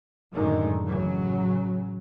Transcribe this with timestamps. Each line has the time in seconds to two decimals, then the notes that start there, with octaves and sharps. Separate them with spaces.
0.32 F#2 A2 D3 D#3 G#3
0.85 A1 C#3 F#3